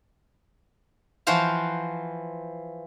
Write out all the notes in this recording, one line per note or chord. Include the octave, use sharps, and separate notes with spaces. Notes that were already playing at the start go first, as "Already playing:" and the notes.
E3 F3 F#4 C5 F5